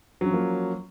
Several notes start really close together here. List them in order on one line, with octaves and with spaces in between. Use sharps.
F#3 C#4 F3 A#3